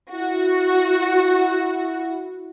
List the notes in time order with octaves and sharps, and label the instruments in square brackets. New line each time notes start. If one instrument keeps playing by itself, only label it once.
[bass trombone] E4 [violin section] F#4